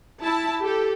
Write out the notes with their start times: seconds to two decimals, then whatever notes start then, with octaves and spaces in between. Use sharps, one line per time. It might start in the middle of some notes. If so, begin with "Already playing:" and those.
0.22 E4 A5
0.63 G4 A4